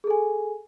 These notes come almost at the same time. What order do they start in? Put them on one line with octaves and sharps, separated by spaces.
G#4 A4 G#5